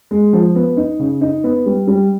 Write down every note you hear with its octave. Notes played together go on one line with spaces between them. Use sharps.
G#3
F3
B3
D#4
C#3
D#4
B3
G3
G3